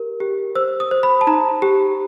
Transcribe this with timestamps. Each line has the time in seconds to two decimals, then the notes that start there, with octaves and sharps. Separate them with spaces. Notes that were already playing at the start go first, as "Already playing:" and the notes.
Already playing: G4 A#4
0.20 G4
0.55 C5 E6
0.80 D#6
0.91 C5
1.03 B5
1.21 A5
1.27 D#4 A#5
1.62 G4